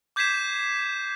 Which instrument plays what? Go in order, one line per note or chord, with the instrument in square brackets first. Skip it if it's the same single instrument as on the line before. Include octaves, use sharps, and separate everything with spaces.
[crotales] D6 G6 G#6 B6 C7 E7